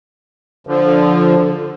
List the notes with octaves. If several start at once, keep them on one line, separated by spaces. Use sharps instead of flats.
D3 F3